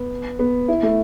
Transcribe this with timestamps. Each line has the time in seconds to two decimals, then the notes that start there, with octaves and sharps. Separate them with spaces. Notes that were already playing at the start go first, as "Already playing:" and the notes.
Already playing: B3
0.39 B3
0.68 E4
0.83 A3